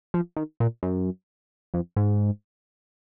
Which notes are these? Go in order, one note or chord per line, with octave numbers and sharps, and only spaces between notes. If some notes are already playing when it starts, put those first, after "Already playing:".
F3
D#3
A#2
F#2
F2
G#2